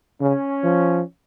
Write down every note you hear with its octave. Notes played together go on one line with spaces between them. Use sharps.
C#3 C#4
F3